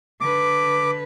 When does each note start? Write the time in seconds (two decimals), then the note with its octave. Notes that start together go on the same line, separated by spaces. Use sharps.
0.21 D3 B4 D6